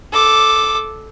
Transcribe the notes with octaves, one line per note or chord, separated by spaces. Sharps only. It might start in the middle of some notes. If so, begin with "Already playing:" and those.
A4 D6